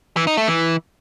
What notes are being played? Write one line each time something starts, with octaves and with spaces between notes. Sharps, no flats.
E3
D#4
A3
E3